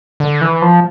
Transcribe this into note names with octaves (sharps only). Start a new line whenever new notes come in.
D3
E3
F3